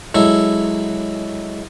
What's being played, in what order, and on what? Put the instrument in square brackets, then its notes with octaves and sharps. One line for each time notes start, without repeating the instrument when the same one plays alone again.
[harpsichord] F#3 G#3 E4 A4